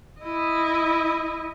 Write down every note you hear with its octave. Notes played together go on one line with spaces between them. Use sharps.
E4 D#5